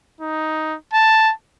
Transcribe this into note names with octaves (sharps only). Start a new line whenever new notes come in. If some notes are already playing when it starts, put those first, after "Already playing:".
D#4
A5